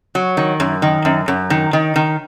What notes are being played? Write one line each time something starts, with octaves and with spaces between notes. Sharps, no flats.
F#3
D#3
F#2
D#3
F#2
F#2
D#3
D#3
D#3